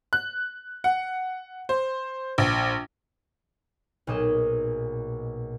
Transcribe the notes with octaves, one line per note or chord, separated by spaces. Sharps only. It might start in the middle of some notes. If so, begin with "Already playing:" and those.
F#6
F#5
C5
A#1
B1 A#2 G#4 D#5 E7